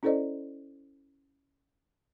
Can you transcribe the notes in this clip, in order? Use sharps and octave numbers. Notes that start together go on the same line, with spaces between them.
C#4 E4 A4 C5 D5 D#5